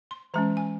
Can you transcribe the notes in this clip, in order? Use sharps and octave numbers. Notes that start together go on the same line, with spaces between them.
C6
E3 G#3 C#4 A#5
G#5